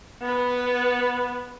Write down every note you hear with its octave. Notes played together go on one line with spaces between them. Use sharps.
B3 B4